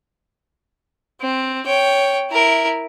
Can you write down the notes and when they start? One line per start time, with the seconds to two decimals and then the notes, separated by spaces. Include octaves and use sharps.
1.21 C4
1.66 C#5 G5
2.31 E4 A#4